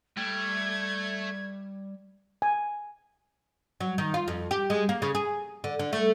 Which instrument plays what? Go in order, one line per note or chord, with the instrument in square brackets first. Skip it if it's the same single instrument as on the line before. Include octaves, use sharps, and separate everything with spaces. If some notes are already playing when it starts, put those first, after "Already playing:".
[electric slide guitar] G3 G5 [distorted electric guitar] A3 [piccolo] G#6
[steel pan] G#5
[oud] F#3
D#3
F4
F2
G4
G#3
A#3
C#3
G#4
D3
D3
A3